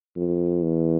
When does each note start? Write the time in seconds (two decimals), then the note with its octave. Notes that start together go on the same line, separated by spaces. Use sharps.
0.17 F2
0.63 E2